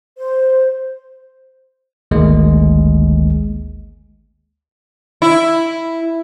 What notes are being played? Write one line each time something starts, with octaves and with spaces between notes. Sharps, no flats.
C5
G#1 D2 D#3 G#3 A#3
E4